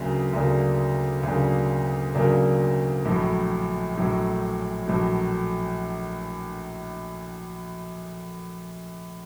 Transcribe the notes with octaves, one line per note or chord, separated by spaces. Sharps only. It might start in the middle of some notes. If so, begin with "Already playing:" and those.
Already playing: D2 C#3 F#3 A#3 D4
D2 C#3 F#3 A#3 D4
D2 C#3 F#3 A#3 D4
D2 C#3 F#3 A#3 D4
A#1 A2 F#3
A#1 A2 F#3
A#1 A2 F#3